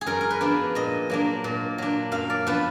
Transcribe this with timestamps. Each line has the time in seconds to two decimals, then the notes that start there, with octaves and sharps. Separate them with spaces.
0.01 G#4
0.06 F#2 A#4
0.21 A#4
0.30 B4
0.41 F3 B3 D4
0.75 A#2 D#5
1.10 F#3 A#3 D4
1.44 A#2
1.78 F#3 D4
2.12 F#2 F5
2.30 D5
2.46 F3 B3 D4 B4